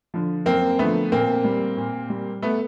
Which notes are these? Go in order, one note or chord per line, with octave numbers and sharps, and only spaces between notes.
D3 F3
F#2 A#3 C4
D3 F3 A3 B3
A#2 A#3 C4
G3
A#2
G3
A3 B3